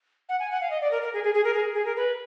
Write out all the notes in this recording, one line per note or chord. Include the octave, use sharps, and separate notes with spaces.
F#5
G#5
F#5
F5
D#5
D5
A#4
A#4
G#4
G#4
G#4
A#4
G#4
G#4
A#4
B4